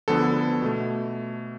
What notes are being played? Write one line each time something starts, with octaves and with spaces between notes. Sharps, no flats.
D2 D3 F3 B3 A4
B2 A3